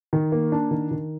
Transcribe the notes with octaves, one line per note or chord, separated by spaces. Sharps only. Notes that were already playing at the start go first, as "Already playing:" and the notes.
D#3
A#3
D4
D#3
D#3